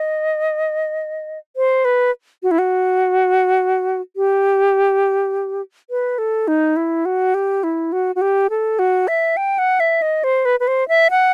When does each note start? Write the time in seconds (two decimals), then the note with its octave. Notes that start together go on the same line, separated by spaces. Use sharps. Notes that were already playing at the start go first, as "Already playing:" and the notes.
Already playing: D#5
1.56 C5
1.85 B4
2.43 F#4
2.51 E4
2.59 F#4
4.16 G4
5.90 B4
6.18 A4
6.48 D#4
6.76 E4
7.05 F#4
7.34 G4
7.64 E4
7.92 F#4
8.15 F#4
8.21 G4
8.50 A4
8.79 F#4
9.08 E5
9.37 G5
9.58 F#5
9.80 E5
10.02 D#5
10.24 C5
10.45 B4
10.60 B4
10.68 C5
10.88 E5
11.11 F#5